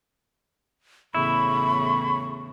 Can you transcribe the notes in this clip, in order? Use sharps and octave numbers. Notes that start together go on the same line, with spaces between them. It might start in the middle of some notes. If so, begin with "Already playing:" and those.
E2 A2 C#3 E4 B5 C#6